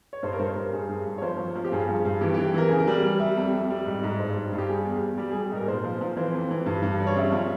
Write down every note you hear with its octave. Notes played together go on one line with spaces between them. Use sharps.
C#5
G2 C5
A#4
G2 C5
G2 A#4
G2 G#4
G2
G2
C#5
F3 C5
F3
F3
G4
G2 G#4
F3
G2
E3 G4
E3 G4
E3 A#4
C#3 G#4
A#4
G3
G3
G3 E5
F2
F2
G3
G#2
G#2
G2 C5
G3
G2
G4
G3 G#4
E2
E2
G3 G4
G#4
G3
G#4
G#2 A#4
A#2 C5
F3
F3
E3 C5
F2
E3
G2
G2
G3
C#5
C#3 E5
F3